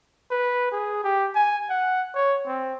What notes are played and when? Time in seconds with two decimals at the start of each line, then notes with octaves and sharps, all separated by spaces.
0.31 B4
0.72 G#4
1.04 G4
1.35 G#5
1.69 F#5
2.15 C#5
2.46 C4